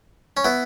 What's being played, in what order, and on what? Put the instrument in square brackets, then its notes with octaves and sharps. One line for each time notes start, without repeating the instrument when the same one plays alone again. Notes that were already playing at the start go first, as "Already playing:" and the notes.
[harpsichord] C#4
B3 E4